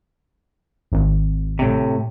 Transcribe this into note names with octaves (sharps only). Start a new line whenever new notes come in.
G#1
A2 C3